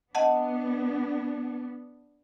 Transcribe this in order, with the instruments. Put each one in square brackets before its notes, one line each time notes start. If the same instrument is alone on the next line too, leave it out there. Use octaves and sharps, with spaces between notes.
[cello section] B3 D4 [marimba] D#5 F#5 A5